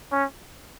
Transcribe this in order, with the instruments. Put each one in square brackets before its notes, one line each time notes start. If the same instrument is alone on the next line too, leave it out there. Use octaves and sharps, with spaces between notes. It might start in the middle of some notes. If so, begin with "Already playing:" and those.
[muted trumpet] C#4